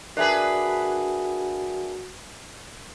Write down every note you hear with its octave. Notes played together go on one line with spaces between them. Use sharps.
D4 F#4 G#4 A#4 B4 E5 G#5